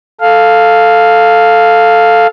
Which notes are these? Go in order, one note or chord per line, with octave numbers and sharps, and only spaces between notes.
A4 F5